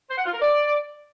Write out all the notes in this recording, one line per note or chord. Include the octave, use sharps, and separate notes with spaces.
C5
F#5
F4
A#4
D5